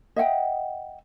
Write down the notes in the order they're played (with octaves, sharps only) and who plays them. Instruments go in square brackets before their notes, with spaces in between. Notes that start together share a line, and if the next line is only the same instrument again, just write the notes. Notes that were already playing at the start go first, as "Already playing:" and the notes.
[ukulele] D#5 E5 F#5 G5